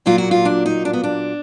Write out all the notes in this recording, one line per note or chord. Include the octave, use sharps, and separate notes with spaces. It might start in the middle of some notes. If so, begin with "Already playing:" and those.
A#2 F#3 A#3 F4
F#4
F4
D4
D#4
D4
B3
D4